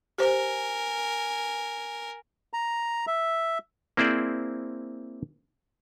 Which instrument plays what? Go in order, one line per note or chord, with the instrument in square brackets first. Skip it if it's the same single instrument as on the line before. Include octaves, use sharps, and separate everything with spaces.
[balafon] G4 C5 [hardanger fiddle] A#4 G#5
[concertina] A#5
E5
[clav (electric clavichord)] A#3 C4 E4 G#4 C5 D5